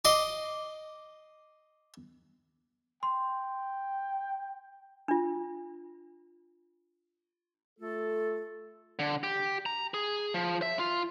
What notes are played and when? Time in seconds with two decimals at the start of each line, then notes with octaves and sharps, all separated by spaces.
0.05 D#5 C6 D6
3.03 G5 C6
5.08 D4 F4
7.79 A3 F4 A4
8.99 D3
9.23 G4
9.66 A#5
9.94 G#4
10.34 F3
10.62 E5
10.79 F4